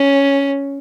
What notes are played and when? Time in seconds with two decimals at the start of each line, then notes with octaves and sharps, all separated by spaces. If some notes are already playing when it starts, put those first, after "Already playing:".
Already playing: C#4